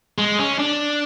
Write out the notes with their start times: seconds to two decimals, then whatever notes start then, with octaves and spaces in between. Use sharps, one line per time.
0.18 G#3
0.39 C#4
0.59 D4